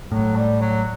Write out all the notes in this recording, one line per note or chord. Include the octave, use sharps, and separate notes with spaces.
A2 F#3
G3
F#3